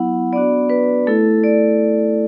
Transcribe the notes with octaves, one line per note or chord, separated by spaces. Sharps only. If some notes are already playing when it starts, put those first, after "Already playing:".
Already playing: F#3 B3 E4 F#5
B3 D4 F#4 D5
B4
A3 E4 A4
D5